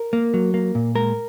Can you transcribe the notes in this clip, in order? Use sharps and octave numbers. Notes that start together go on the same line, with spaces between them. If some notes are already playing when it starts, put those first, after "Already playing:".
Already playing: A#4
A#3
F#3
A#3
A#2
G#3 A#4